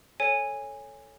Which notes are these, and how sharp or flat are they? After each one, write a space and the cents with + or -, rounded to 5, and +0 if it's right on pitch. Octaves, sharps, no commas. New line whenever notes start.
A4 +0 C#5 +0 G#5 -15